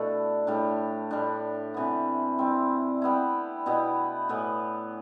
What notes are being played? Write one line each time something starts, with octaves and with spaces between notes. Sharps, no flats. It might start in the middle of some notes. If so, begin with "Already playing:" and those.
Already playing: B2 A3 D4 E4 A4
A2 G3 D4
A2 G3 D4
C3 E3 B3
G3 C4 E4
G3 B3 E4
B2 B3 E4 G4
A2 E3 B3